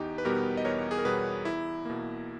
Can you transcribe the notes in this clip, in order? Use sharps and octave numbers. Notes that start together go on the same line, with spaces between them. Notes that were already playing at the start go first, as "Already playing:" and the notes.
Already playing: E2 D#4 G4
B4
B2 G3 B3 G4 A#4
D#5
E2 A#4 C#5
G#4
A#4
B2 G3 B3 G#4 B4
E2 E4
B2 A#3